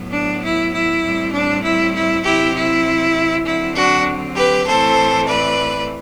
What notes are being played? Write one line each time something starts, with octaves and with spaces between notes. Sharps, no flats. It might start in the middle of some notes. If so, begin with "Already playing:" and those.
Already playing: A2 F#3 B3
D4
E4
E4
A2 G3 C4
D4
E4
E4
C3 F#3 C4 E4 G4
E4
D3 F#3 C4 E4
D4 F#4
G4 B4
A2 E3 A3 C4 A4 C5
B4 D5